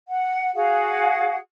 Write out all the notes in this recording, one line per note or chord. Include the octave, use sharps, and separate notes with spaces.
F#5
F#4 G#4 F5 F#5